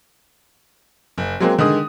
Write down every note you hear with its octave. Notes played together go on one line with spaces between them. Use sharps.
F#1
F#3 G#3 A#3 C4
D3 D#3 G#3 D#6